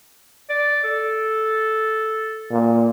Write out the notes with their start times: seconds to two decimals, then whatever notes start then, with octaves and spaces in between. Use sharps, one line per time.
0.50 D5
0.84 A4
2.51 A#2